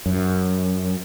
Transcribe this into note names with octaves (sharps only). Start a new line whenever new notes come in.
F#2